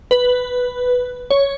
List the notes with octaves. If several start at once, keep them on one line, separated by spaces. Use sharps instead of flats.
B4
C#5